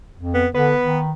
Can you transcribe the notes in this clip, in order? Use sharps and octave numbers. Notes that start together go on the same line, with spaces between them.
F2
B3
D3 B3 B4
D#3